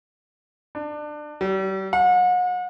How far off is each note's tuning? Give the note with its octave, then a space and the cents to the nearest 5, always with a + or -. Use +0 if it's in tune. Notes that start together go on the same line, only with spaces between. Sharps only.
D4 +25
G3 -40
F#5 -40